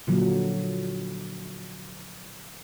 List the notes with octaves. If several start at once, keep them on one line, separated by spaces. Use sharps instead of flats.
A#2 D3 F3 F#3